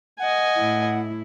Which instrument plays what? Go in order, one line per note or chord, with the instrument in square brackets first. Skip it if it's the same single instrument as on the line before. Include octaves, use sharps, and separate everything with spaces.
[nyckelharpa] D#5 G#5 [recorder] F#5
[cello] A2 E4